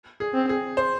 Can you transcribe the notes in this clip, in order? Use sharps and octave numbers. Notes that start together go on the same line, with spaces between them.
G#4
C4
G#4
C5